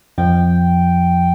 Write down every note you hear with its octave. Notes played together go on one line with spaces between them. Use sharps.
F2 F3 G5